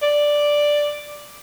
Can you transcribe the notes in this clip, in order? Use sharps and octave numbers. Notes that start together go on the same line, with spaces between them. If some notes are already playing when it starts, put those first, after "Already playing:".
D5